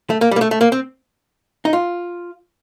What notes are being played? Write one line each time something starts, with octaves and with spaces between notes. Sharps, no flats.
A3
A#3
G3
A#3
A3
A3
A#3
C4
D#4
F4